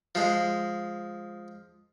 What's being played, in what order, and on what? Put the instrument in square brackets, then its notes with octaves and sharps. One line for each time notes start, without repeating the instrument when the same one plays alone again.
[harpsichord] F3 G#3